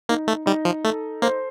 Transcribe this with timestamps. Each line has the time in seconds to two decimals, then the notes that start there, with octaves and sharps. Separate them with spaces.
0.09 A#3 D#4
0.28 A3
0.46 G3 D#4
0.65 F3
0.85 A3 A4
1.22 A#3 C5